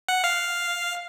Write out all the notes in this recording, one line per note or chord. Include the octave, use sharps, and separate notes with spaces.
F#5
F5